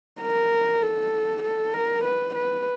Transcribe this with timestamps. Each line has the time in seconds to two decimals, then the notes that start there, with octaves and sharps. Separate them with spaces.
0.21 A#4
0.83 A4
1.43 A4
1.74 A#4
2.05 B4
2.36 B4